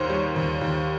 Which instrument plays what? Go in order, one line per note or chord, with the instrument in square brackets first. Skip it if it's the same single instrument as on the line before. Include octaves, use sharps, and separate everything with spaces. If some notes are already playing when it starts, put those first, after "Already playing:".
Already playing: [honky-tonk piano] D#2 D#3 C5 C#5
G3
D#2
D#2